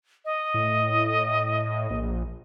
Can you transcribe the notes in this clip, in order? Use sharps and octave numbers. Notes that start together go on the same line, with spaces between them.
D#5
A2
A#1